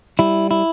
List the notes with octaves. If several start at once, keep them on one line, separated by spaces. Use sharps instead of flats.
G3 E4
E4